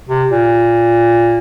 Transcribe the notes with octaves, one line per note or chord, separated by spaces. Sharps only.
C3
A#2